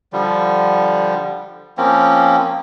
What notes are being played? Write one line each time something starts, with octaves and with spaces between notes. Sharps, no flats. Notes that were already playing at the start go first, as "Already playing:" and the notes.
D3 F3 G3
F3 A#3 C4 C#4